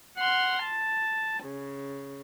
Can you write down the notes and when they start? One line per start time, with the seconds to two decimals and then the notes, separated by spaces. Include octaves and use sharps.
0.17 F#5 C6 F6
0.64 A5
1.44 C#3